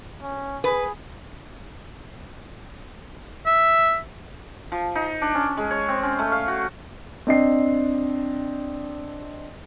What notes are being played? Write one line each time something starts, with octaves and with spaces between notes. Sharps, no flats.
C#4
G#4 B4
E5
F3
D#4
D4
C#4
G#3
C#5
C4
C#4
A3
F5
F#4
C4 D4 D#5 C7